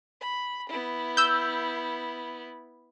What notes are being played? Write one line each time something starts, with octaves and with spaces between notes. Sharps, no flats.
B5
B3 E4
E6 G6